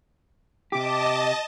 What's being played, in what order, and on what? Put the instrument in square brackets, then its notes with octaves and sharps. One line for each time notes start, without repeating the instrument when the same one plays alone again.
[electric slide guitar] C3 G4 [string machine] D#5 A5 [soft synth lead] D6